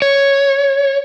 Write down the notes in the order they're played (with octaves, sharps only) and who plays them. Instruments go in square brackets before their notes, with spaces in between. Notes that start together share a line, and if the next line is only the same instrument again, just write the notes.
[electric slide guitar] C#5